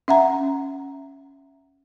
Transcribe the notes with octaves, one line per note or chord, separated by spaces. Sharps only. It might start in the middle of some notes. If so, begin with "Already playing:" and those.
C#4 E5 F#5 A#5